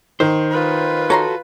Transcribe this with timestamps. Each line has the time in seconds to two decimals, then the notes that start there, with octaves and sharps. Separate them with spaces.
0.20 D#3 C5
0.51 F4 B4
1.10 F#4 A4 C#5 A#5 C6